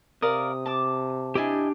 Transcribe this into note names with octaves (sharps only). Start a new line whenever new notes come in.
C3 A#4 D5 F5 D#6
A5 D6
D4 E4 G4 D#5 G#5